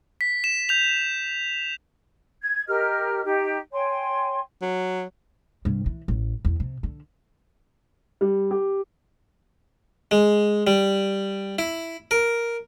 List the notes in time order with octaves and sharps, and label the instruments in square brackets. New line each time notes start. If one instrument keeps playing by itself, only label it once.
[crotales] B6
E7
G6 F7
[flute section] G#6
G4 A#4 D#5 F6
D#4 G4
C#5 G5 G#5 C6
[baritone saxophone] F#3
[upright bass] G2 C3
E3
A1
E2
C3
D3
[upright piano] G3
G4
[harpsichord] G#3
G3
E4
A#4